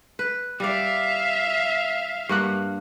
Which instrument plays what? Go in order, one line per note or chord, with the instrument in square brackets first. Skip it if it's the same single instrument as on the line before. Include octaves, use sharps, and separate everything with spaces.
[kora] B4
[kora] G3 D5 [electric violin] E5 F5
[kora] G2 A#3 F#5